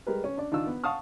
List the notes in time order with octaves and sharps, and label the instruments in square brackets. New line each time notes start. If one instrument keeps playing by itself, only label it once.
[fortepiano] G3 G#3 A#4 B4
C#4
D4 D5
D#3 D4 F4 E6
B3
F5 F#5 A5 C#6 D#6 F6